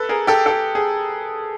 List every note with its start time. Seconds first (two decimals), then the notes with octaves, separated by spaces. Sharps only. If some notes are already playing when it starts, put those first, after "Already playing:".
Already playing: A4 B4
0.09 G#4 A#4
0.27 G4 A4
0.46 G4 A4
0.75 G#4